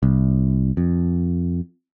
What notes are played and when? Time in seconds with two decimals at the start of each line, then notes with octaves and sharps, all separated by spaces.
0.03 C2
0.77 F2